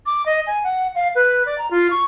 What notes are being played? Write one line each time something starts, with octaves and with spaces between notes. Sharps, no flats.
D6
D#5
G#5
F#5
F5
B4
D5
A#5
F4
C#6